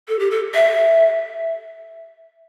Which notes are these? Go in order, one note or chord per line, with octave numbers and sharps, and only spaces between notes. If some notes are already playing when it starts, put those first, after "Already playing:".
A4
G4
A4
E5